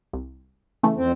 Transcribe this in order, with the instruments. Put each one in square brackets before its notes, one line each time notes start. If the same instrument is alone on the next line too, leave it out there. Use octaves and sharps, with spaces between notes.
[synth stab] C2
C#3 E3 A3
[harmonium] F2 C4